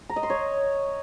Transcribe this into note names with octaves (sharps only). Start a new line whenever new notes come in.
A#5
D#5
C6
C#5